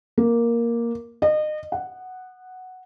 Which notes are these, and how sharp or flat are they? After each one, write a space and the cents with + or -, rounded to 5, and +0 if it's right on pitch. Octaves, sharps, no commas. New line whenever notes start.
A#3 +5
D#5 -30
F#5 +0